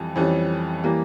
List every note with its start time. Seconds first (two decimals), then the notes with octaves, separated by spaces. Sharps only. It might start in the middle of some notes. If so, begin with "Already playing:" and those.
Already playing: F2 E3 G3
0.16 F2 E3 G3 C#4
0.84 E3 G3 A#3